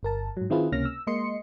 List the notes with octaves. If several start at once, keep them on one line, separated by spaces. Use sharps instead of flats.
G1 A#4 A5
G#2 F#3
D#3 C4 E4 F4 G#4 B4
C#2 C3 A#3 C#4 F6 A#6
E6
G#3 A#3 D#5 C6 C#7